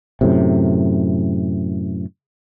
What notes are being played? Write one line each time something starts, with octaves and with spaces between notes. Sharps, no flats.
F#2 A2 C3